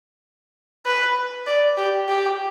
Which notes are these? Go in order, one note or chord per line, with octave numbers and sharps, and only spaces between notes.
B4
D5
G4
G4